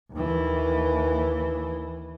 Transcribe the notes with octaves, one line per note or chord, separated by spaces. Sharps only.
D#2 E3